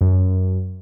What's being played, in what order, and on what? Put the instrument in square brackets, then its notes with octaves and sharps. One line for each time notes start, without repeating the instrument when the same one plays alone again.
[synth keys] F#2